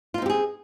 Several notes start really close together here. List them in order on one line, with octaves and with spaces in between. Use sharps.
F4 D#4 C4 G4 G#4